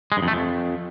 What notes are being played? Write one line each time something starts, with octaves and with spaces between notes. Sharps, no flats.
G#3
G2
F2
A3
F2